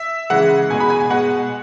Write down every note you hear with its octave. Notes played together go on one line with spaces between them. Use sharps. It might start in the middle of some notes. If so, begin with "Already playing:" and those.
Already playing: E5
C#3 E3 G#3 F#5
B2 G#3 G#5
B5
G#5
G#5
B2 G#3 F#5